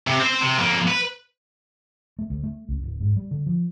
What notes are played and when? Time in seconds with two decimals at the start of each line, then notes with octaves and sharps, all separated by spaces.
0.07 C3
0.20 C4 C5
0.41 C3
0.58 F2 A#3
0.88 B4
2.19 A3
2.30 D2
2.43 A3
2.69 C#2
2.83 D1
3.00 G#2
3.16 G3
3.31 D3
3.46 F3